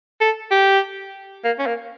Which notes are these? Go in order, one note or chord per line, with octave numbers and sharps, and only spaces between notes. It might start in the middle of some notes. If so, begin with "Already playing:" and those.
A4
G4
A#3
C#4
A#3